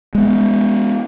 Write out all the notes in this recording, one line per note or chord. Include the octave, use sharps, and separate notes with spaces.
G#3 B3